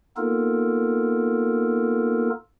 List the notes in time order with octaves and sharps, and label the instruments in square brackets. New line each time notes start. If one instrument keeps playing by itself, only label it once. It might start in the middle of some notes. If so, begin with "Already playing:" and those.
[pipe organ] A#3 B3 D#4 F4 A4 A#4